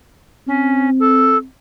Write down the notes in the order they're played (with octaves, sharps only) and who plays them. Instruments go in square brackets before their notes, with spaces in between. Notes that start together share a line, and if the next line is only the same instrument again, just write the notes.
[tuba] C4 [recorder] C#4
[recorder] A4